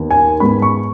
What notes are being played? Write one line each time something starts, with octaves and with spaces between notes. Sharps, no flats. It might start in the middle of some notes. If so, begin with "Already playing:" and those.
Already playing: D#2 D#3 B3 D#4
G#5
G#2 G#3 B3 B5
C#6